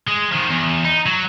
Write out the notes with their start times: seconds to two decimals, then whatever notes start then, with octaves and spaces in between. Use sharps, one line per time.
0.07 G#3
0.32 D#3 F3
0.49 E2
0.85 D#4
1.06 F#3